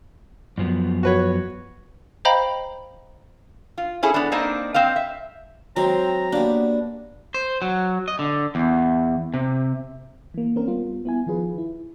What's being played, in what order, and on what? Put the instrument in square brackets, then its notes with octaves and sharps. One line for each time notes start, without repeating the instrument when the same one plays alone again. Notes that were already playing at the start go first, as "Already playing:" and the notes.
[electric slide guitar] F#2 F3 B3
[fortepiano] F#4 B4 C#5
[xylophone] C5 D#5 F5 G5 A#5 B5
[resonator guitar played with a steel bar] F4
C#4 E4 G#4 A4
B3 D4
A#3 C4 D4 D#4 D#5
C4 D#5 F5
E5
[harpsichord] D#3 G#3 C5 [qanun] F#3 [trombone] C4 [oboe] A#5
[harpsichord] A#3 F#4 [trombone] B3 [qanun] D4 G4
[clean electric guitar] C5
F#3
D#5
D3
E2
C3
[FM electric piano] E3 A#3
C4 C#4 A#4
G3 B3 F4
B3 E4 G#5
D#3 F3 F4 G#4 B4
E4